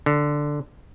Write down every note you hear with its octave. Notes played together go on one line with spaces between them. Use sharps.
D3